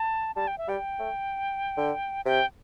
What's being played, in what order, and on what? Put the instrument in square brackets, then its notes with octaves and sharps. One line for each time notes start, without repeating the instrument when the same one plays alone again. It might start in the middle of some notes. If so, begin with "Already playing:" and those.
Already playing: [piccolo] A5
[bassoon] G3 [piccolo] A5
[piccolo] G5
E5
[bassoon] G3 [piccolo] G5
[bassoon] A3
D3
[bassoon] C3 [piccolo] G5